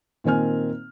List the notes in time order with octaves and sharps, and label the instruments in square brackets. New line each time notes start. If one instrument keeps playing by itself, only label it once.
[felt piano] A#2 D#3 C4 G#5 F6